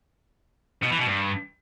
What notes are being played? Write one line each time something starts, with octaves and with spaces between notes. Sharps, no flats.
B2
E3
B2
G2